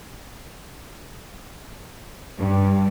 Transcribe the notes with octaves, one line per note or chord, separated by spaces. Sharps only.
G2